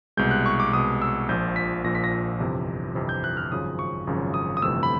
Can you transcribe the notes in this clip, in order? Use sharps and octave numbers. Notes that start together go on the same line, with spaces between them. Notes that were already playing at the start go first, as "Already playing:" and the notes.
C2 B2 G#3 G6
F#6
C#6
D6
C2 B2 G#3 D#6
E6
A#1 A#2 F3 G6
B6
A#1 A#2 F3 A#6
B6
A#6
G1 F2 C3 E3
G1 F2 C3 E3
G6
F#6
F6
G#1 F#2 C#3 F3 D#6
C#6
G#1 F#2 C#3 F3
D#6
D#6
G1 F2 C3 E3 A3 E6
B5